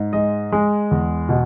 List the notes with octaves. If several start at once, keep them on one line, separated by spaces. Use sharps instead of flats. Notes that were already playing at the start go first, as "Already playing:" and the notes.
Already playing: G#2
G#3 D#5
G#3
E2
B2